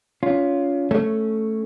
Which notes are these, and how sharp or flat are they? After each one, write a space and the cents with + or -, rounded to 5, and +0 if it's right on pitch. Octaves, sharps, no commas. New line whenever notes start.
C#4 +30 F4 +0
A3 +0 C#4 +0